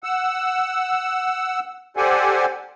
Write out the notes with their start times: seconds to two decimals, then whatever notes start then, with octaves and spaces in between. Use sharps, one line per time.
0.04 F#5 E6
1.97 G4 A4 C5 D5 F#5 G#5